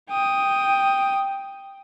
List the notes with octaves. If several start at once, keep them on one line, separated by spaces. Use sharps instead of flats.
G5 D#6